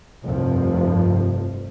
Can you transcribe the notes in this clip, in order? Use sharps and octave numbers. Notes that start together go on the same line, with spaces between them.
F1 C2 G2 C3 F3